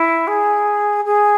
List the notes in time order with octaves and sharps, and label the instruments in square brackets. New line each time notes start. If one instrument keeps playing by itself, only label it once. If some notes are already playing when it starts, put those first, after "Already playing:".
Already playing: [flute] E4
G#4
G#4